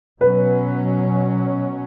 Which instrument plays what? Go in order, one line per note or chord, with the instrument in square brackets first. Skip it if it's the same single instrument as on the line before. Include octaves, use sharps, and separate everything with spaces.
[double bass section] B2 F#3 C#4 [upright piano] B4